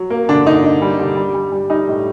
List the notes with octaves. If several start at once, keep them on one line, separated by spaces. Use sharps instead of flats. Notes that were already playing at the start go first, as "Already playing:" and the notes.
Already playing: F#3
A#3
D3 D4
D3 D#4
D3
G3
D3
G3
G3
G3
G3 D#4
A2